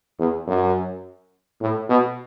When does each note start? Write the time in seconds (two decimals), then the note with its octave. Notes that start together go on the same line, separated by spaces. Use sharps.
0.19 E2
0.47 F#2
1.61 A2
1.89 B2